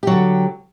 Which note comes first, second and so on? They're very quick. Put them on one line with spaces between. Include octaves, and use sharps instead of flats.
G4 F#3 D3